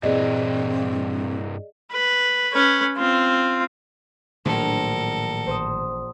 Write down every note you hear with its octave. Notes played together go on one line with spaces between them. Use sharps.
G2 A#2 E3 C4 G#4 D5 D#5
B4
C#4 B4
C4 F4
A#1 A2 D#3 F#3 A4 A#4
A1 C5 D#6